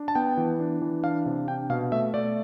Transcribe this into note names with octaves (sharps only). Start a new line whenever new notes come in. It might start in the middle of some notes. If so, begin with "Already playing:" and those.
Already playing: D4
A5
B3 G5
E3
D4
E3
D4 F5
C3
D4 G5
B2 F5
A3 E5
A3 D5